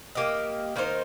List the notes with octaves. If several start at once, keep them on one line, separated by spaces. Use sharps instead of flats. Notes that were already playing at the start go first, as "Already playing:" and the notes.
A#3 G4 D#5
D#3 A#3 D#4 C5